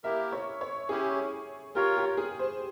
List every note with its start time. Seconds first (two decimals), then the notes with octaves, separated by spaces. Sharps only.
0.04 A#3 E4 G4 A#4 E5
0.32 C#5
0.61 C#5
0.89 C#4 E4 G4 G#4
1.75 F4 G4 A#4 C#5
1.97 G4
2.17 G#4
2.39 C5